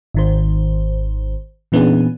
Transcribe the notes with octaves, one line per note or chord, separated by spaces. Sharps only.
G#1 D#3 C5
A#2 E3 B3 C#4 D4 G#4